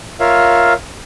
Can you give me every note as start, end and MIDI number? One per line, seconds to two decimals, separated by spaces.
0.20 0.73 65
0.20 0.73 70
0.20 0.73 73
0.20 0.73 76
0.20 0.73 77